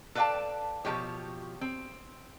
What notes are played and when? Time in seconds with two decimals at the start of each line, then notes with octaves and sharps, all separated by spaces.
0.15 A4 B4 D5 F5 G5 A5
0.85 B2 F3 G#3 G4 C#5
1.61 C4